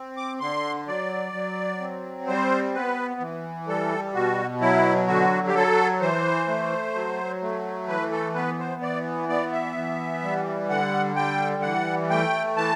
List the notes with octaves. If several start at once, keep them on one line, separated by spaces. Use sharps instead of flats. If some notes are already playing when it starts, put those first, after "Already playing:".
Already playing: C4
D6
D3 C6
F#3 D5
F#3
C4
G3 C5
B3 B4
E3
G3 A4
B2 F#4
F#3 E4
D3 F#4
G4
F#3 A4
E3 C5
A3
F#3
A3
E3 B4
A4
B3 B4
C5
E3 D5
B3 D5
E5
E3
G3
D3 F#5
G3 G5
E3 F#5
A3 G5
E3 A5